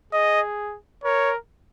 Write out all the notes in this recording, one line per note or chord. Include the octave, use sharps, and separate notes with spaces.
G#4 D#5
A#4 C#5